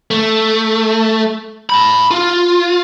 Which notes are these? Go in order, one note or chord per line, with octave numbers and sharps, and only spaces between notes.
A3
A5 B5
F4